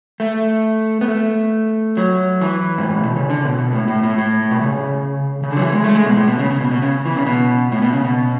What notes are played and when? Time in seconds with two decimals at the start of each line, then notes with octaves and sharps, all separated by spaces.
0.20 A3
1.01 B3
1.08 A3
1.97 F#3
2.41 E3
2.78 G#2
2.90 A2
3.03 B2
3.16 C#3
3.30 D3
3.44 B2
3.59 B2
3.73 A2
3.88 A2
4.03 A2
4.18 A2
4.51 B2
4.61 C#3
5.43 C#3
5.50 D3
5.57 F#3
5.61 E3
5.72 G#3
5.84 A3
5.94 G#3
6.06 B2
6.16 A2
6.28 B2
6.39 C#3
6.50 C#3
6.61 B2
6.71 B2
6.82 C#3
7.06 E3
7.16 C#3
7.26 B2
7.72 A2
7.82 B2
7.93 C#3
8.05 B2